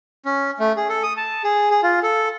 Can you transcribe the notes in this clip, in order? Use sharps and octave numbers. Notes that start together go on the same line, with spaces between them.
C#4
A3
G#4
A4
D#6
A5
G#4
G#4
F4
A4